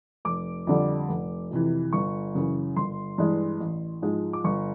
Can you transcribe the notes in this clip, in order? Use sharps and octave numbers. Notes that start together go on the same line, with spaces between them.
F1 D6
F2 D3 G3
F1
F2 C3 E3
G1 C#6
F#2 C#3 E3
G1 C6
G2 E3 G#3
A1
G#2 F3 G#3
D6
G1 C#6